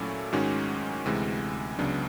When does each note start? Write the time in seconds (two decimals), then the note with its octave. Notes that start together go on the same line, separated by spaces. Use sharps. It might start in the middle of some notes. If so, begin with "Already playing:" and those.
Already playing: A#2 F#3 A3 C#4 E4
0.33 G#2 D#3 G#3 C#4 F#4
1.06 D2 C3 E3 G#3
1.79 C#2 C#3 F#3 B3 D4